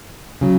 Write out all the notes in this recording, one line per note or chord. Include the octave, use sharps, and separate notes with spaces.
C#3 F#3